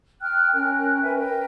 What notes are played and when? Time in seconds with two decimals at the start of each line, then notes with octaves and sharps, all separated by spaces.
0.21 G5 F6 F#6
0.53 C#4 A#4 G5 F#6
1.02 B4 E5 G5 G#5
1.17 A#4 G5